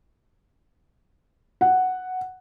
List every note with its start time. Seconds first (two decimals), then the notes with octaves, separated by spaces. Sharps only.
1.61 F#5